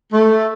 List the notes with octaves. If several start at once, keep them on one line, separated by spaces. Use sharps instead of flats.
A3